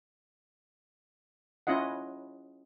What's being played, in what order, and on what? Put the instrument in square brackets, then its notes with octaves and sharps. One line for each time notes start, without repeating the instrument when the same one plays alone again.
[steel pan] C#4 E4 F4 D#5 F#5